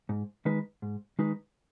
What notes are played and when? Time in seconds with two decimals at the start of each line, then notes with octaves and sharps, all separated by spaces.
0.09 G#2
0.45 D#3 G#3 D#4 B4
0.82 G#2
1.19 D#3 G#3 D#4 B4